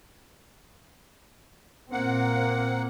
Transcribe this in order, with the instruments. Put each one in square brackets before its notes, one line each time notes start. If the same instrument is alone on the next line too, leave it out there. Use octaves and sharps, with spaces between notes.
[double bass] A#2 C4 [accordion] A#3 F#5